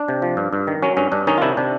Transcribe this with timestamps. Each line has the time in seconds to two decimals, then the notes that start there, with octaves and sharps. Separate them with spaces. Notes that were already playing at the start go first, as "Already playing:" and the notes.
Already playing: D4
0.08 C3
0.22 F3
0.37 G2
0.53 G2
0.67 D#3
0.82 F#3 C#4
0.97 G2 C#4
1.12 G2 D4
1.27 D#3 C#4 D#4
1.38 F4
1.41 C3 D4 E4
1.57 C3 D4